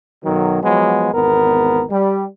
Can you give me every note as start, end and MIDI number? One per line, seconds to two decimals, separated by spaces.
0.25 0.61 35
0.25 0.61 51
0.25 0.61 54
0.63 1.12 53
0.63 1.12 54
0.63 1.12 56
0.63 1.12 59
1.13 1.84 32
1.13 1.84 40
1.13 1.84 59
1.13 1.84 70
1.90 2.26 55